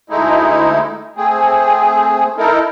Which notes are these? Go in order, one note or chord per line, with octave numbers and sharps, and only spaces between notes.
D2 G#3 A3 D#4 E4
A3 C4 G#4
D#4 E4 A4 A#4